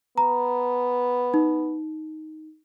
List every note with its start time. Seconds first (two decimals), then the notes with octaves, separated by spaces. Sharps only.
0.18 B3 A#5
1.34 D#4